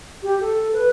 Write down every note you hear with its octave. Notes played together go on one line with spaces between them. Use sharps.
G4
A4
B4